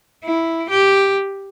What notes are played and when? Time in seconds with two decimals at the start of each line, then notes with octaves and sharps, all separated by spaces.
0.24 E4
0.70 G4